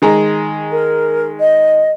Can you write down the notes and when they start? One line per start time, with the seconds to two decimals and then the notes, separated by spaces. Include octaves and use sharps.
0.02 D#3 G#3 A#5
0.71 A#4
1.40 D#5